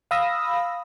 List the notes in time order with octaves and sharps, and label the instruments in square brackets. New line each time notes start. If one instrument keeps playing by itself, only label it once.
[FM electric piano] F5 B5 D#6 E6 A#6